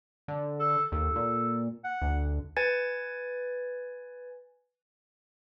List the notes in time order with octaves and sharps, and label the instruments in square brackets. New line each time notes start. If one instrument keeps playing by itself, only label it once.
[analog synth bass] D3
[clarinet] A4
[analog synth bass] D#2 [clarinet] A4
[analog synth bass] A#2
[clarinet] F#5
[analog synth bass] D2
[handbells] B4 G#5 G#6 A6